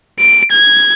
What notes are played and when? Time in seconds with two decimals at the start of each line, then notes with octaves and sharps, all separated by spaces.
0.19 D7
0.51 G#6